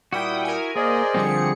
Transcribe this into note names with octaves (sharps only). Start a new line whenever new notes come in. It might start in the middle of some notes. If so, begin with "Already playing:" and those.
A#2 G3 E4 F#4 G5 D#6
A#4 G#5
A#3 G#4 C5 D5 D#5
D3 F3 G3 C4 C#7